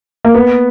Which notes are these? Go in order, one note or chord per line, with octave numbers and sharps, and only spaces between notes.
A#3
B3